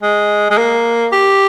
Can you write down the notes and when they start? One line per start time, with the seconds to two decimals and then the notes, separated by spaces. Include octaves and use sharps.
0.02 G#3
0.51 G#3
0.58 A#3
1.13 G4